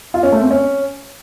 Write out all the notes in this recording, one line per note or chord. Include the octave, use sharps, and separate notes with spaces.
F4
C#4
A3
C4
C#4